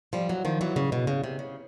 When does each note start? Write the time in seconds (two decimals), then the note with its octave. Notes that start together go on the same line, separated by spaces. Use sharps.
0.13 F3 G3
0.29 E3 F#3
0.45 D#3 F3
0.61 E3 F#3
0.76 C#3
0.92 B2
1.07 C#3
1.24 C3
1.39 C#3